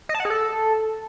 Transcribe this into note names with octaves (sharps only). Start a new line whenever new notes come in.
D#5
A5
F#5
G#4
A4